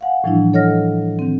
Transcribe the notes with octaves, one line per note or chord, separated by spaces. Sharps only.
F5 F#5 G#5
A2 E3 F3 G3 D4 E4
A4 C#5 D#5 F#5 F6 A#6
D#3 C4